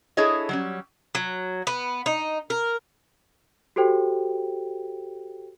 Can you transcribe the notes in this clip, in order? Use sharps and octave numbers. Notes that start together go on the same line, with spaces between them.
D4 E4 G#4 A4 C#5 D#5
F#3 G3 C#4
F#3
B3
D#4
A#4
F#4 G4 A4 C5 G5